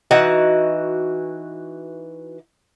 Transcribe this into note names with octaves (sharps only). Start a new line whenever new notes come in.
E3 D#4 F#4 F#5